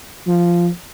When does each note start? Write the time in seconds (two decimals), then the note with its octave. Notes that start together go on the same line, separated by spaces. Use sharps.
0.27 F3